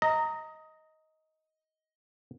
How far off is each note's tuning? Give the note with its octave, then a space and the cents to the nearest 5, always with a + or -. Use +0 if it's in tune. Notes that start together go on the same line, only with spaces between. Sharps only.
D#5 +15 A#5 -15